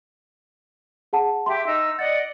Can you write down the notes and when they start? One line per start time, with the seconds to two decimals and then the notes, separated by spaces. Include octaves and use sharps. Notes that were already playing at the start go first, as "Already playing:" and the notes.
1.13 G#4 F#5 A5
1.46 G4 E5 C6
1.65 D#4 E6
1.99 D5 D#5 F#5 A6